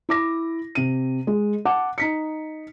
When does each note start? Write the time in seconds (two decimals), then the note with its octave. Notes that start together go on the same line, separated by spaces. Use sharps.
0.09 E4 D6 A#6
0.75 C3 D#7
1.27 G#3
1.65 F#5 A5 D6
1.98 D#4 B6 C#7